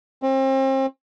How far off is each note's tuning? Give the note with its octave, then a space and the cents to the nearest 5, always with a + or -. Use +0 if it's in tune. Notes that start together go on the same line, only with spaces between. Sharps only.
C4 +35